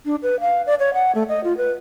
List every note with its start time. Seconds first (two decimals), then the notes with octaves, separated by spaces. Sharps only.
0.05 D4
0.23 B4
0.40 F5
0.67 D5
0.79 C#5
0.94 F#5
1.15 A3
1.29 D#5
1.44 F4
1.57 B4